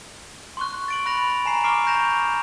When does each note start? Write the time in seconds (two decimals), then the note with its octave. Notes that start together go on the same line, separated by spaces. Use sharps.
0.57 C6 C#6 F#6
0.88 A6 D7 F#7
1.06 B5 F#6 A#6 F7
1.45 G#5 A#5 C7
1.63 C#6 D6 F6 C7 D7
1.87 G6 A#6 E7 F7